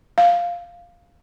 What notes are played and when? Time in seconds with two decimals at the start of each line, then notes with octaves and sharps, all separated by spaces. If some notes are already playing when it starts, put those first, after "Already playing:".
0.18 F5